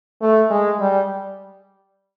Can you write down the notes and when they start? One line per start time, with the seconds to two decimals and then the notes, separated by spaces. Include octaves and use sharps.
0.22 A3
0.51 G#3
0.80 G3